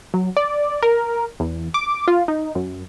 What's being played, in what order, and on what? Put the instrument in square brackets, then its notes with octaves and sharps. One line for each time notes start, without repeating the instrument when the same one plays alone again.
[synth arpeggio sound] F#3
D5
A#4
E2
D6
F4
D#4
F#2